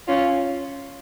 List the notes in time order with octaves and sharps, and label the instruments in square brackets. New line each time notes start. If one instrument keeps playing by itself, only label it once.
[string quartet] C#4 F4